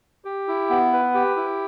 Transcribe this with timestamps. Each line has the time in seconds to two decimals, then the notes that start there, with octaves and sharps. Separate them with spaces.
0.25 G4
0.48 E4
0.70 B3
0.93 B4
1.14 G4
1.36 E4